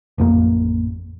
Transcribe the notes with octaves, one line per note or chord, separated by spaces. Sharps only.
A1 F2 A#3